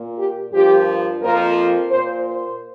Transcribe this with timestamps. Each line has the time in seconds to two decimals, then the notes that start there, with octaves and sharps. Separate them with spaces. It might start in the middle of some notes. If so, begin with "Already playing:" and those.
Already playing: A#2 A#3
0.17 G4
0.52 G2 F3 A#3 G4
1.22 F2 F3 A#3 A#4
1.91 A#2 A#3 C5
2.26 C5